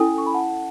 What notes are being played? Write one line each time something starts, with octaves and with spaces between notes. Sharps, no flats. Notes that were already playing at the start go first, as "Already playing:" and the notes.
Already playing: C#4 E4 A4 G#5
C#6
B5
F#5 A5